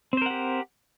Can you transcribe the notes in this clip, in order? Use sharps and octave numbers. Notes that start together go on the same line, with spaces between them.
C4 G4 A#4 C5 F#5